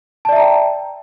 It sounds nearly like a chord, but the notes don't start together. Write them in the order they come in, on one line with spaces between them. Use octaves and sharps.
A5 D5 E5 A#5 G5